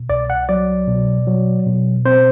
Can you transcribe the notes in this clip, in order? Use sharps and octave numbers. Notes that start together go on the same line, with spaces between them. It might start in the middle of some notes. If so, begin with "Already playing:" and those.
Already playing: B2
C2 D5
F#5
F#3 D5
B2
F#3
B2
C4 C5